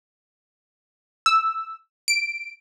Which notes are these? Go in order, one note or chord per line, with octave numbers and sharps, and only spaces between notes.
E6
D7